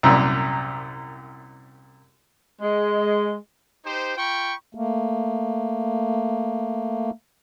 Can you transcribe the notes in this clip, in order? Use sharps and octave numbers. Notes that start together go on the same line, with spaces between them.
C2 F#2 A#2
G#3
D#4 G4 C5
F4 G5 B5 C#6
A3 A#3